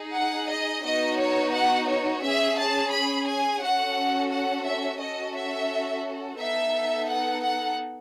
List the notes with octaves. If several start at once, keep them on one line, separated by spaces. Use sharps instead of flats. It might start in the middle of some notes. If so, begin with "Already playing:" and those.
Already playing: D#4 G#4
F#5
D#5
B3 D#4 F#4 D#5
C#5
F#5
C#5
C#4 G#4 E5
A5
B5
G#5
C#4 F#4 A4 F#5
F#5
E5
C#4 F#4 A4 D#5
E5
B3 D#4 A4 E5
F#5
F#5